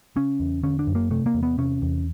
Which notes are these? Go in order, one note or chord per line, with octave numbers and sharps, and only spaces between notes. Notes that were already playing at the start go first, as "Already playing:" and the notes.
C#3 C#4
E2
D3 C#4
D4
F#2
A#3
C3 A3
A#3
E2
B3
C3 C#4
E2